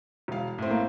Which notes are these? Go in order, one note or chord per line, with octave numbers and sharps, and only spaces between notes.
E1 F5
A2 C4
A#3